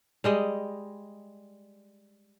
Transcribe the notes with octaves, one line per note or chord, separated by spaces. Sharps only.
G3 G#3 D#5